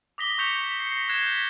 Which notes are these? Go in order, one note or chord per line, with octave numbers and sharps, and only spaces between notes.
D6 D#6 A#6 B6 G7
C#6 D6 G6 B6 C#7 F7
B6
A#6 C7 C#7
F#6 G#6 A#6 C7 E7 G7
G6 B6